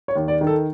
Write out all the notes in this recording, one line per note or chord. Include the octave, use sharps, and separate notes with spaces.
C#5
D#2
D5
D#3
A4